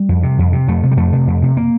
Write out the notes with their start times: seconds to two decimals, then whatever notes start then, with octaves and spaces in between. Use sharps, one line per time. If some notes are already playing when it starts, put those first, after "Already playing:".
Already playing: G3
0.09 F2
0.23 C3
0.39 F2
0.53 C3
0.68 F2 A3
0.83 C3
0.91 G3
0.97 F2 A3
1.13 C3
1.27 F2
1.42 C3
1.57 A#3